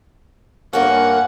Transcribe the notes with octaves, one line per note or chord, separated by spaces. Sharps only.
G2 A#3 C#4 F#5